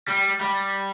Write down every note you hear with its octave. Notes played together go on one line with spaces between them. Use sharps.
G3
G3